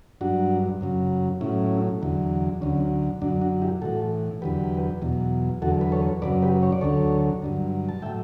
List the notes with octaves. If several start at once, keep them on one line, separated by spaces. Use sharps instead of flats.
G2 F#3 D4 F#4
F#2 C#3 F#3
A2 F#3 C#4 E4
E2 D3 F#3
D2 D3 F#3 C#4
F#2 D3 F#3 D4
D4 F#4
E4 G4
A2 E3 F#4 A4
E2 D3 F#3 G4 B4
E2 B2 F#3
E2 D3 F#3 F#4 A4
B4
A4 C#5
F#2 C#3 F#3 B4 D5
G4 B4
C#5
D5
D2 D3 F#3 A4 C#5
G2 D3 F#3
A5
A2 F#3 E5 G5